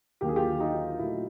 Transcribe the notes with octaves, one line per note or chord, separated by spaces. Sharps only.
D#2 D3 F#3 A#3 G4
G#4
F4 G4
D#4 F4
A#2 F#3 A3 E4